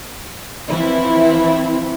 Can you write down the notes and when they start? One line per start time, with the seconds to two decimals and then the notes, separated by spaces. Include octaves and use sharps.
0.69 E3 F3 C4 E4